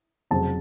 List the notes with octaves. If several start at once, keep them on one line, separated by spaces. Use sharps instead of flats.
F1 F2 C#3 F#3 A5